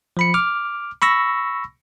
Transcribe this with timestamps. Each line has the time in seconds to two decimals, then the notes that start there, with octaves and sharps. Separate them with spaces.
0.17 F3 B5 C#7
0.34 D6 F6
1.02 B5 C#6 E6 A#6